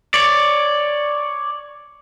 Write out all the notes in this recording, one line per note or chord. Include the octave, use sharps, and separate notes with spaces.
C#5 D5